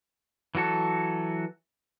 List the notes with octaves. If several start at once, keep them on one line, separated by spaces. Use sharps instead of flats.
E3 F#3 F#4 A4